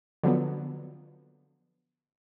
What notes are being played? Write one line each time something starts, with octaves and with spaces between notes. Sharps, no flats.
D3 F3 F#3 B3